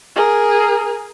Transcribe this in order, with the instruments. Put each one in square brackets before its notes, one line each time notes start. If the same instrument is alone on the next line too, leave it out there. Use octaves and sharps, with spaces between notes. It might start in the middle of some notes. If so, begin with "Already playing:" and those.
[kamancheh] G#4 A#4